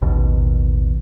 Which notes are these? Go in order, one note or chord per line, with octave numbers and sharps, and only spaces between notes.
A1 D#2 B2 D#3